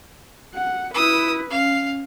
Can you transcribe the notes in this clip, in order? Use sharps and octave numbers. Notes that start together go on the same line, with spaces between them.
F#5
E4 B4 D#6 E6
C#4 F5